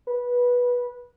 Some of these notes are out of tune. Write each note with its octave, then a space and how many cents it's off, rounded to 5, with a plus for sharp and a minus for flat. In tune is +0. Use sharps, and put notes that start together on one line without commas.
B4 -15